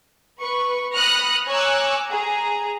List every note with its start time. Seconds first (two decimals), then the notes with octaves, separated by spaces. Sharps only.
0.39 B4 C#6
0.95 B5 D#6 F6 F#6 A#6 C#7
1.50 C#5 G#5 A#5 D6 E6 F#6
2.09 G#4 A#5